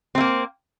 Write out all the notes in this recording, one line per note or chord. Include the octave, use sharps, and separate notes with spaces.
A3 A#3 C4